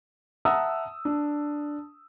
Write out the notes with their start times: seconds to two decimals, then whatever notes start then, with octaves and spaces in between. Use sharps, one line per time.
0.45 E5 F#5 A5 A#5 D#6 E6
1.05 D4